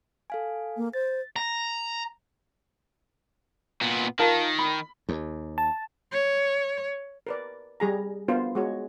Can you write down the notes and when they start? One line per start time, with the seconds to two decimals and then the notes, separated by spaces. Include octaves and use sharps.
0.30 A4 F5 G#5
0.77 A#3
0.94 C5 A6
1.36 A#5
3.81 A#2 B3
4.19 D#3 F4 A#4 A5
4.59 B5
5.09 D#2
5.58 A5
6.12 C#5
7.27 A#4 B4 D5
7.80 G3 G#4 A#5
8.28 B3 D4 F4 A#4 C5
8.55 G#3 F#4 C#5